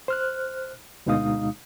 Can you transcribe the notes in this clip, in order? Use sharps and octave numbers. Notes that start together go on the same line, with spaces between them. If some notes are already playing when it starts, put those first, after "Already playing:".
C5 F6 F#6
D2 B2 G#3 D#4 F5 D#6